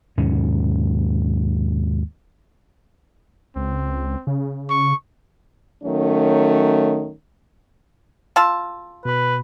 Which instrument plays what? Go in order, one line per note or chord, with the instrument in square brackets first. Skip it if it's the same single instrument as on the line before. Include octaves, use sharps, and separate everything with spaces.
[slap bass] D#2 G#2 B2 C#4
[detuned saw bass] C#2 [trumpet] C4
[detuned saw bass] C#3
[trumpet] C#6
[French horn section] D#3 F#3 A3 C#4
[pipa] F4 A5 [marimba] C6 E6
[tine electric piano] B2 B5 [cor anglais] B4